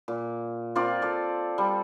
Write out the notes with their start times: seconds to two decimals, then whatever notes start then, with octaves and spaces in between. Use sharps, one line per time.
0.08 A#2
0.75 C4 F4 A#4 D5
1.02 A4 D5
1.58 G3